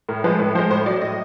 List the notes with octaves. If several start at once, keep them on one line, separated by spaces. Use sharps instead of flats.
A2 A#4
F3 G#3 B4
A2 B4
F3 G#3 C5
A2 C5
F#3 D5
A2 D#5